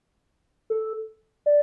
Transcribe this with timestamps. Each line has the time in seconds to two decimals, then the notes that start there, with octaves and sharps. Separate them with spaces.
0.70 A4
1.46 D5